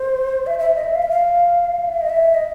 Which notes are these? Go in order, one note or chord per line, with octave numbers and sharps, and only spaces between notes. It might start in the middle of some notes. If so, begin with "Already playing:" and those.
Already playing: C5
E5
E5
D#5
E5
F5
E5
F5
E5
D#5
E5
D#5